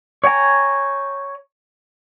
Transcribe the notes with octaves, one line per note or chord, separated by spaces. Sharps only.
C#5 G5 G#5 A#5